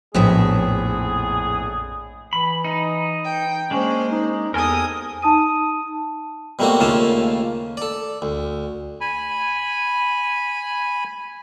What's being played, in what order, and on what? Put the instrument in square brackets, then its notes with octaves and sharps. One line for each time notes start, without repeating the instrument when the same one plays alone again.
[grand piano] A#1 B3 [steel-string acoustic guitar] F2 A2 E5 [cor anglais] G#4
[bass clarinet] E3 [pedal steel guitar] B5
[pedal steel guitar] D#4
[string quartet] G5
[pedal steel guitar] G#3 D4 [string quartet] A#3 C5 [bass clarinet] C#4
[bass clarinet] D#4
[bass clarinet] E2 [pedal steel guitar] G4 A4 A#4 [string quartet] G#5 D#6
[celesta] D#4 A5 D#6 D#7
[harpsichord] B2 G3 A3 A#3 C4 F#4
D#2 C#3 A3 A#3 F4 A5
A4 D5
D2
[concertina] G#5 B5